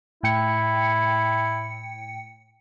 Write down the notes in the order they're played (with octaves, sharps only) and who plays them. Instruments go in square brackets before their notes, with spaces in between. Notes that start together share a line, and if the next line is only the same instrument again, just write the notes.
[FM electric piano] A2 G5 C#7 [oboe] E4